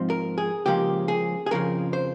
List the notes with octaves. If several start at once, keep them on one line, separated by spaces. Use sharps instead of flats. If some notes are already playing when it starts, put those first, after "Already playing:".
Already playing: G#2 F3 C4
A#4
G#4
C#2 C#3 F3 A#3 G4
G#4
G#4
F2 C#3 F3 A#4
C5